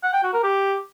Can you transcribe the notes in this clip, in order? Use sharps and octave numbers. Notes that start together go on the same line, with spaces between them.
F#5
G5
F#4
A#4
G4